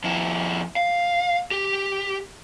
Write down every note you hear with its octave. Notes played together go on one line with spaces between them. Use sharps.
F2 E4
F5
G4